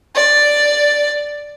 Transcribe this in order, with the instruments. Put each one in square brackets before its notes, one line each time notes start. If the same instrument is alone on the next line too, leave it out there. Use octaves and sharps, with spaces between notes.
[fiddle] D5